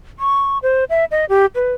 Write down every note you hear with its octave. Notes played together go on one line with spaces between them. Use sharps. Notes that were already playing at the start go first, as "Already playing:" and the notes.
C#6
C5
E5
D#5
G4
B4